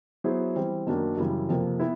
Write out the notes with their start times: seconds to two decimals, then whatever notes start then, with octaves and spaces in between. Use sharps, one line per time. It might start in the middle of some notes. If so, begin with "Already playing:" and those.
0.24 F#3 B3 E4 G#4 C5
0.56 E3 G3 C4
0.87 F#2 D#3 F#3 A#3 D4
1.17 F#2 C#3 E3 G3
1.49 F2 C3 F3 A#3
1.79 B3 E4